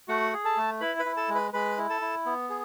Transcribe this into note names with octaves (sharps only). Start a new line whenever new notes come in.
A3 F#4 F#5
G#4
A4 A5
A3
E4 B4 B5
B4 B5
E4
A4 A5
G#3
B4 B5
G#3 B4 B5
E4
A4 A5
E4
B3
G#4